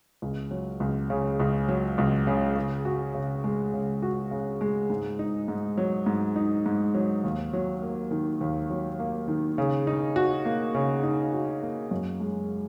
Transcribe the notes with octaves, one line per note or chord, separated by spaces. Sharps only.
C#2
F#3
C#2
C#3
C#2
F#3
C#2
C#3
C#3
F#4
C#3
G#3
C#3
F#4
C#3
G#3
G#2
D#4
G#2
F#3
G#2
D#4
G#2
F#3
D#2
F#3
A#3
D#3
D#2
F#3
A#3
D#3
C#3
D#4
F#4
A#3
C#3
D#4
F#4
A#3
F#2
G#3